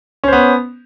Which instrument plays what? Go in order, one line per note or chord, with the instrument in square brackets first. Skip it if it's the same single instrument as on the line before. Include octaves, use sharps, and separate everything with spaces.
[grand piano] C#4
C5
B3